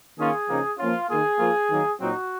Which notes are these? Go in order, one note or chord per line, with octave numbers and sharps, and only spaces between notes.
D#3 A#3 C#4 F4 G#4
C#3 F3 A#3 D#4
F3 A#3 C#4 F4
D#3 A#3 F4 G#4
F3 A#3 F4
D#3 F#3 A#3
A#2 F#3 C4 D#4 F#4